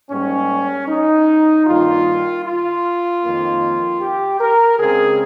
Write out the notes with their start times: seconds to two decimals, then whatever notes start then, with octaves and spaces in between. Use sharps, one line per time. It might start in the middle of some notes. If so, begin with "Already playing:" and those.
0.11 G#2 G3 A#3 C#4
0.88 D#4
1.67 G2 D#3 A#3 F4
2.45 F4
3.23 F2 D#3 A#3
4.01 G4
4.40 A#4
4.79 C#3 G#3 C4 G#4